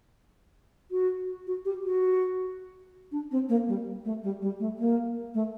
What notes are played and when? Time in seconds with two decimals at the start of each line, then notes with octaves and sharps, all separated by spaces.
0.91 F#4
1.47 F#4
1.65 G4
1.83 F#4
3.11 D4
3.31 C4
3.49 A#3
3.67 G3
4.04 A3
4.23 G3
4.41 G3
4.59 A3
4.78 A#3
5.34 A3